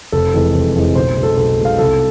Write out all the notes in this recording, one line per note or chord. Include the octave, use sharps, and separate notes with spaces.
F1 A4
F2 E3 G#3
F1
F2 E3 G#3
B1 C5
B2 G#3
A4
B1 A4
B2 G#3
F5
C2 A4